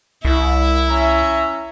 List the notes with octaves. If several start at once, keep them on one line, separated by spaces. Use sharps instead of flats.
C2 E4
C#4 E5 A#5